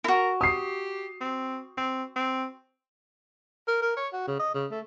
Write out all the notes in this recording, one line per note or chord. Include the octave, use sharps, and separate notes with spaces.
E4 F#4 A#4
G4 D#6 C7
C4
C4
C4
A#4
A#4
C#5
F#4
C#3
D#5
C#3
A3